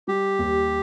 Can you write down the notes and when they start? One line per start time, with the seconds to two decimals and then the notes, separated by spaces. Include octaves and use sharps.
0.07 G3 G4
0.39 D#2